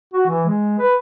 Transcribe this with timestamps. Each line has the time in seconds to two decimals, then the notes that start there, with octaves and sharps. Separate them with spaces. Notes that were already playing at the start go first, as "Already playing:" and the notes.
0.14 F#4
0.27 E3
0.46 G#3
0.79 B4